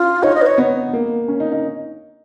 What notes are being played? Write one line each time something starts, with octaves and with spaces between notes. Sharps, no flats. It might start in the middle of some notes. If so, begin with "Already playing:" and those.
Already playing: C#4 F4
D#4 C#5
D#5
B4
C#5
B3
A#3
C#4
D#4
D#4